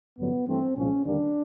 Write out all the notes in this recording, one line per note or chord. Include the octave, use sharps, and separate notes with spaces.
A1 G2 D3 F#3 B3
G2 E3 A3 C4
C2 A#2 F3 G#3 C#4
D#2 D3 G3 A#3 D4